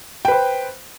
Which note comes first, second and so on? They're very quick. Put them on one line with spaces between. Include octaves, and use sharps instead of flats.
G5 B4 C5